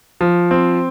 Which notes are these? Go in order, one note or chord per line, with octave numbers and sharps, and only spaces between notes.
F3
C4